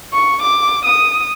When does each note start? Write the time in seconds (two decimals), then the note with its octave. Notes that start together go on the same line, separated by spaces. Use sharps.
0.13 C#6
0.42 D6
0.85 D#6